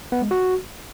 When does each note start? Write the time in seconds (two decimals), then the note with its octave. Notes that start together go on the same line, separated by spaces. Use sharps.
0.12 B3
0.22 G#3
0.31 F#4